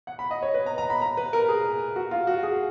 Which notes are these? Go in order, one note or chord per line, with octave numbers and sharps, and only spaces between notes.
F#5
B5
D#5
C#5
B4
A#5
A#5
B5
A#5
B4
A#4
G#4
F#4
F4
F#4
G#4